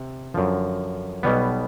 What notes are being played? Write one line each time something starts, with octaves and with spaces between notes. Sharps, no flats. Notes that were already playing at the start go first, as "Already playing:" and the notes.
Already playing: C3
F#2 D3 F3
B1 B2 G3 B3